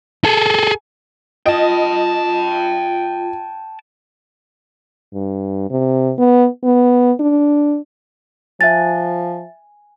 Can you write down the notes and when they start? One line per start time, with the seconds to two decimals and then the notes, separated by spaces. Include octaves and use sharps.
0.25 G#4 A4
1.46 F4 D#5 G5 A5
5.13 G2
5.70 C3
6.18 B3
6.64 B3
7.20 D4
8.61 F3 E5 G#5 F#6 A6